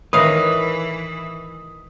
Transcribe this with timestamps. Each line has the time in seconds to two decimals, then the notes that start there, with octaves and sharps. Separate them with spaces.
0.13 A2 D#3 E3 A#4 B4 F5 D#6